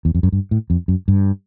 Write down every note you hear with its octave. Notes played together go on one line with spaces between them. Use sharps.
E2
F2
F#2
G2
A2
F2
F#2
G2